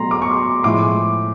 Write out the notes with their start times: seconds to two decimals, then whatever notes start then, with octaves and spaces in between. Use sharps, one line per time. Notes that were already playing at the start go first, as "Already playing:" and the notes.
Already playing: B2 F#3 A3 A#5 C6
0.11 D6
0.22 C#6
0.31 C6 D6
0.63 A2 F3 G#3 C6 D6